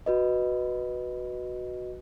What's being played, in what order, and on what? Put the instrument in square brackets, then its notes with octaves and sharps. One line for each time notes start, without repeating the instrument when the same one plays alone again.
[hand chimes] F#4 B4 D#5